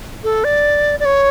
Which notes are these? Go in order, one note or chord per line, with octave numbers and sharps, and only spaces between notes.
A4
D5
D5
C#5